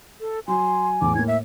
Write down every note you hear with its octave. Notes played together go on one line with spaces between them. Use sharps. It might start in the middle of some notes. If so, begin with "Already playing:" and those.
A4
F#3 G#5 C6
E2 A2 D6
A2 A#3 G#6
E5